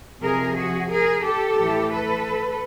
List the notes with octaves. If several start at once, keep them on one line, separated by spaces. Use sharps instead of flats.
F2 C3 F3 G#4 A#4
F#4 G#4
G#4 A#4
G4 A4
A2 E3
A4 B4